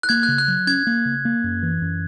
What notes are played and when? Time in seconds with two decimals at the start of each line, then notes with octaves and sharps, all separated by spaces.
0.03 F#6
0.09 A#3 G#6
0.23 F#6
0.28 C#3
0.38 F#6
0.48 F#3
0.67 C#4 G#6
0.87 A#3
1.05 C#3
1.25 A#3
1.44 F#2
1.63 E3
1.82 F#2